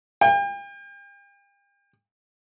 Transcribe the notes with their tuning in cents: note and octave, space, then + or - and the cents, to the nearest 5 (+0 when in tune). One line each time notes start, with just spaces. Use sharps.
G5 +40